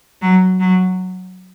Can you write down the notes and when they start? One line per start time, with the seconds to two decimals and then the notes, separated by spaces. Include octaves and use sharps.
0.22 F#3
0.60 F#3